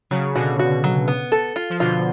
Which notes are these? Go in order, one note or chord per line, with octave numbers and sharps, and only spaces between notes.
C#3 F#3
B2 D3 F#4
F#4
F#3
B3
A4
F4
F3
B2 D3 F4